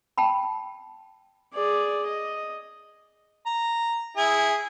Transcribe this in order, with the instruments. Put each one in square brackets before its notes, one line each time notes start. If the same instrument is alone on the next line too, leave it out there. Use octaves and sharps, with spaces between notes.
[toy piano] G5 A5 B5
[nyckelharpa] G#4 D5
D#5
[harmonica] A#5
E4 G#4